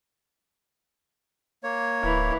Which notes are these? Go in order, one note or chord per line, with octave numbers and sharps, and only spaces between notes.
A#3 C#5
D1 E3